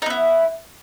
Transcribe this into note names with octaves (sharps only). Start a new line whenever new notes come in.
B3 D#4 E4